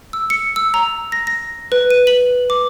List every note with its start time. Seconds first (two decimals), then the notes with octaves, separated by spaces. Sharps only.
0.13 E6
0.30 C#7
0.56 E6
0.74 A#5
1.12 A#6
1.27 A#6
1.72 B4
1.90 D#7
2.07 F#7
2.50 D6